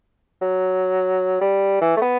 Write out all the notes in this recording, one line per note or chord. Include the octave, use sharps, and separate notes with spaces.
F#3
G3
E3
A3
B3